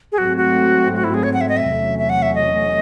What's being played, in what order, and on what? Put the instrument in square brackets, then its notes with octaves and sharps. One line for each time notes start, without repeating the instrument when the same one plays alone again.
[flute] G#4
[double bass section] G#2 F#3 A3 C4 [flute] F#4
[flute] F#4
F#4
E4
G#4
C#5
F#5
E5
D#5
E5
[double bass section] E2 C3 F#3 A3 C#4
[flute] E5
F#5
E5
D#5